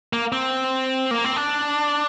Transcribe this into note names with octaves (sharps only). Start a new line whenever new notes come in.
A#3
C4
A#3
C4
D4